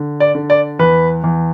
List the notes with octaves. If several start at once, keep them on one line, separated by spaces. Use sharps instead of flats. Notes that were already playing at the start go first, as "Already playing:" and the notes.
Already playing: D3
D5
D3
D5
E2 B4
E2